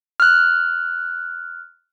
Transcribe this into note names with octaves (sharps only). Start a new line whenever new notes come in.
F6 F#6